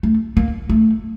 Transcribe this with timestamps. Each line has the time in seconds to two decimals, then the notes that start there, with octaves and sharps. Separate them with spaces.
0.03 A3
0.37 A#3
0.69 A3